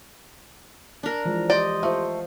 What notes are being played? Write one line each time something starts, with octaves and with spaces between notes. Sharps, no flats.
D4 A#4
E3 F3 G#3
G4 D5 D#5 C6
A3 F4 C5